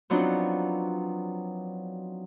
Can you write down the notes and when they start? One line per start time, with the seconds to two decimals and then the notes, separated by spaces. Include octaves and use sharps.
0.10 F3 F#3 B3 C4 D4 D#4